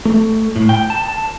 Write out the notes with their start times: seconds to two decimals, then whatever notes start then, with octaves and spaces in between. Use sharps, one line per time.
0.05 A3
0.56 A2
0.69 G5
0.90 A5
1.02 A5